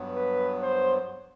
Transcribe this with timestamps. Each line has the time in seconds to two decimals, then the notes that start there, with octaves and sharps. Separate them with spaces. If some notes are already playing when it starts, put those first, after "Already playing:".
Already playing: G2 F#3 B3
0.16 B4
0.62 C5